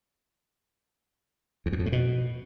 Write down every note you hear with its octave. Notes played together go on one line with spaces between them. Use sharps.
E2
F#2
F2
A2
B2